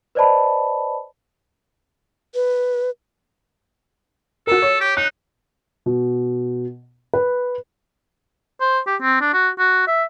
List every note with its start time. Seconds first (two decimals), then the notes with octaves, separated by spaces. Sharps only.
0.15 B4 C5 D5 D#5 A5 B5
2.35 B4
4.47 F#4 A4 A#4
4.62 C#5
4.81 G4
4.97 D#4 F#6
5.86 B2
7.14 B4
8.61 C5
8.87 G4
9.02 C4
9.21 D4
9.34 F#4
9.59 F#4
9.87 E5